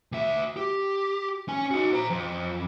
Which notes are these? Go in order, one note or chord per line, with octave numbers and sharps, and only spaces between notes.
D2 E5
G4
C#4 G#5
D#4 F#4
C5 A#5
F2